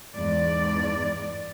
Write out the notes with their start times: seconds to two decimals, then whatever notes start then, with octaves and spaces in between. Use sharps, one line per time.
0.15 E2 G#2 D5